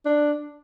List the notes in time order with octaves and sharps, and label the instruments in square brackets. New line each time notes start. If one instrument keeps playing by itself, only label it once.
[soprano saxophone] D4